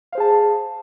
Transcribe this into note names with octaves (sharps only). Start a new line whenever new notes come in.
G#4 C5 F5 A5